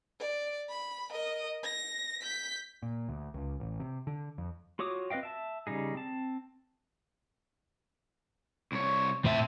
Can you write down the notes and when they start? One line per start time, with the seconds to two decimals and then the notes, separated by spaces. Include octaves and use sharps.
0.20 D5
0.69 B5
1.10 A#4 D#5
1.63 A#6
2.22 G6 B6
2.82 A#2
3.08 D2
3.34 C#2
3.60 A1
3.80 C3
4.07 D3
4.38 F2
4.79 F4 F#4 C#5 D6 D#6
5.10 C4 B4 D#5 F5 G5
5.23 E5 A5
5.67 C#3 G3 D#4 G#4
5.95 C4 A5
8.72 C2 C#5
9.25 A2 C4 A4 E5